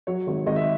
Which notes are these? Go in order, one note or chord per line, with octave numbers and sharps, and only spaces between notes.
F#3 C#5
G#1
G#1 D#5
E5